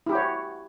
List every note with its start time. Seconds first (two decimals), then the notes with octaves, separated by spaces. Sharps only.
0.06 E4
0.09 G4
0.12 F#4
0.15 C#5